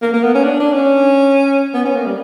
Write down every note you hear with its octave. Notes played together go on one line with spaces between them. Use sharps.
A#3
A#3
B3
C#4
D4
D4
C#4
B3
C#4
A#3
G3